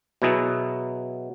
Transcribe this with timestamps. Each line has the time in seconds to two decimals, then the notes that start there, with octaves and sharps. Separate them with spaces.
0.22 B2 F#3 E4 G#4